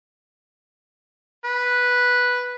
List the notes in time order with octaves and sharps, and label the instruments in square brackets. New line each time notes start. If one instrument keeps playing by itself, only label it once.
[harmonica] B4